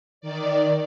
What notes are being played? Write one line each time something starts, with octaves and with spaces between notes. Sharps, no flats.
D#3 D5